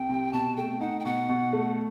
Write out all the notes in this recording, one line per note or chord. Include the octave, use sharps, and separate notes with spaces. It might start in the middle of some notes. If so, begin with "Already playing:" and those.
Already playing: C2 G5
C3
B2 A5
A3 G5
D#4 F#5
G5
B2 F#5
B2
A3